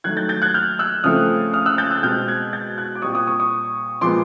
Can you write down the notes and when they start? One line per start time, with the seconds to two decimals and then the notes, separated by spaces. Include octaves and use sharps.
0.04 D#3 F#3 A3 F#6 G#6
0.17 G6 A6
0.29 G6 A6
0.42 F#6 G#6
0.54 F6 G6
0.79 E6 F#6
1.04 C#3 F3 A3 C4 D#6 F6
1.54 D#6 F6
1.66 E6 F#6
1.78 G6 A6
1.90 E6 F#6
2.03 B2 G#3 C4 F6 G6
2.28 F#6 G#6
2.53 G6 A6
2.78 F#6 G#6
2.95 D6
3.02 A#2 G3 C4 C#6 D#6
3.15 C#6 D#6
3.27 C#6 D#6
3.40 C#6 D#6
4.01 A#2 F3 G#3 B3 C6 D6